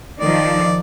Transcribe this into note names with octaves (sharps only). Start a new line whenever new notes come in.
D#3 F3 D5